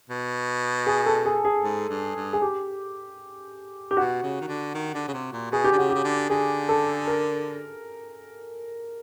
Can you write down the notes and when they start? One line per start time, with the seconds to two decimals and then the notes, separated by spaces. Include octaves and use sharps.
0.10 B2
0.86 G#4
1.06 A4
1.25 G#4
1.45 G#4
1.64 G#2
1.90 G2
2.16 G2
2.33 G#4
2.42 G4
3.91 G4
3.97 B2 F#4
4.23 C#3
4.41 D#3
4.48 D3
4.74 D#3
4.94 D3
5.08 C#3
5.14 C3
5.33 A#2
5.52 B2 G#4
5.64 G4
5.72 D3
5.77 C#3 F#4
5.90 G4
5.95 C#3
6.04 D3
6.30 D3 G#4
6.69 A4
7.07 A#4